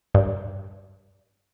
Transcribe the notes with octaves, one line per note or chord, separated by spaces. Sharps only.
G2